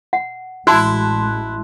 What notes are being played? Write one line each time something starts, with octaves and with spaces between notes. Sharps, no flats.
F#5
A1 G#3 E4 F#4 A5 C6 F#6